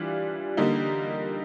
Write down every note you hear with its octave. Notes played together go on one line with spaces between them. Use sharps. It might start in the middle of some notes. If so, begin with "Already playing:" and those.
Already playing: E3 G3 D4 F4
D3 G3 A#3 D#4